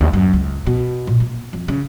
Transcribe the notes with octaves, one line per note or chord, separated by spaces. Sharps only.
D2
F#2
C#2
B2
A#2
A#3
F2
C#3